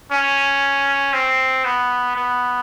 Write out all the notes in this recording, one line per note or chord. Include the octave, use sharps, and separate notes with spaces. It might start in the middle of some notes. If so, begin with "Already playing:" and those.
C#4
C4
B3
B3